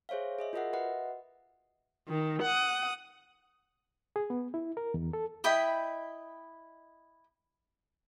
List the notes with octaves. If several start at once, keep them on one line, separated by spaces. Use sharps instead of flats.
G#4 C5 C#5 E5 F5
G#4 D#5 E5
F4 F#4 A#4 D#5 E5 F#5
F#4 B4 D#5 E5 F#5
D#3
F#5 D#6
G#4
B3
E4
A#4
E2
A4
E4 D#5 G5 B5